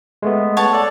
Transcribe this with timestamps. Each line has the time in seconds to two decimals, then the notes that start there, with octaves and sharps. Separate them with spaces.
0.22 G#3 A3 B3
0.57 C#5 F#5 A5
0.73 A4 D5